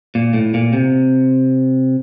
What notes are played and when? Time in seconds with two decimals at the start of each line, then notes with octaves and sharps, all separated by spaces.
0.15 A#2
0.34 A2
0.54 A#2
0.73 C3